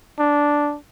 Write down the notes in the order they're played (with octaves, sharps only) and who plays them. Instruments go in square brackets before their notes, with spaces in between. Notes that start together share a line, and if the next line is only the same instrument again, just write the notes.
[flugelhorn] D4